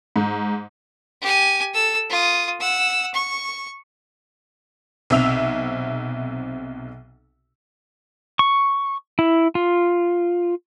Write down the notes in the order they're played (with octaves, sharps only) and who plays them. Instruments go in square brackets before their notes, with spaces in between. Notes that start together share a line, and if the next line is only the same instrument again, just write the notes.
[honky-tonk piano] G#2
[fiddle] G4 G#5
A4 E6
F4 D#6
F#5 E6
C#6
[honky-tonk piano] B1 C3 E5 E6 F7
[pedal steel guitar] C#6
E4
F4